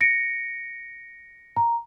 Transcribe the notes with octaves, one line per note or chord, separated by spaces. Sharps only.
A#6 C#7 D7
A#5